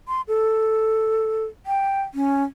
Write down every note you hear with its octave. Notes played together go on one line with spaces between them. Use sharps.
C6
A4
G5
C#4